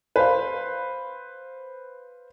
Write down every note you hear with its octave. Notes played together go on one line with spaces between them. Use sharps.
B4 C5 F5